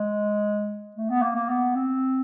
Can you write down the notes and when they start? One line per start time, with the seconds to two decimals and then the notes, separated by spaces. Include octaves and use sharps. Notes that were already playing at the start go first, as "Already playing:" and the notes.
Already playing: G#3
0.96 A3
1.10 B3
1.22 A#3
1.35 A#3
1.49 B3
1.75 C4